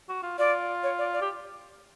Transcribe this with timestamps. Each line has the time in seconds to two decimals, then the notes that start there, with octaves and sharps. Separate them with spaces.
0.09 F#4
0.23 F4
0.39 F4 D5
0.83 C#5
0.98 D5
1.13 D5
1.22 G4